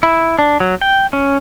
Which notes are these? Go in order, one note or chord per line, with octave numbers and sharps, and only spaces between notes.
E4
D4
F#3
G5
C#4